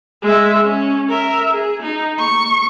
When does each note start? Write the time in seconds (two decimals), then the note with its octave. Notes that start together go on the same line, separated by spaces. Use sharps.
0.22 G#3 E5
0.63 C#4
1.09 A#4 E5
1.52 G#4
1.82 D#4
2.19 C#6